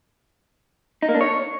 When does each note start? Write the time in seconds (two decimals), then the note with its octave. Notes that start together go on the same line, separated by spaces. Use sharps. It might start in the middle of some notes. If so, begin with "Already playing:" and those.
1.03 D#4
1.09 A#3
1.15 D4
1.21 C#5